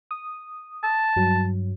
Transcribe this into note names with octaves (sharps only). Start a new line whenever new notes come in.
D#6
A5
G2 F#3